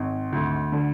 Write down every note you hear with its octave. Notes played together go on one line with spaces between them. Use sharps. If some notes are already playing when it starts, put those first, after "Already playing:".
Already playing: G#1
D2
D3